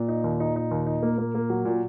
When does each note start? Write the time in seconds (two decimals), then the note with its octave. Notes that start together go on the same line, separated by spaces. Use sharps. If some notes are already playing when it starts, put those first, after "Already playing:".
Already playing: A#2
0.08 D#4
0.24 D#2
0.40 D#4
0.56 D#4
0.71 D#2
0.86 D#4
1.02 A#3
1.18 A#3
1.35 A#3
1.50 F#3
1.65 A#2